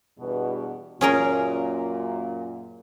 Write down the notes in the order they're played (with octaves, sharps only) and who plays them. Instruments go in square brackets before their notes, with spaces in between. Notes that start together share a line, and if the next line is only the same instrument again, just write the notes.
[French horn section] E2 G2 B2
[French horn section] F#2 A#2 [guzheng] C#4 G#4 A#4